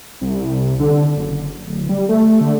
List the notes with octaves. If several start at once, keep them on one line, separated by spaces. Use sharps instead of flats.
C2
D3
F#1
D1
G3
A3
D3